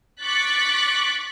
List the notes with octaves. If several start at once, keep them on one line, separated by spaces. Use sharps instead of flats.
C#6 D6 F#6 A6 B6